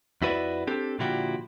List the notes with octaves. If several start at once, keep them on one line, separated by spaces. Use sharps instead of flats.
F2 E4 F#4 B4 D5 E5
C4 D4 G4 A4
A#2 D3 F3 E4 F#4 G4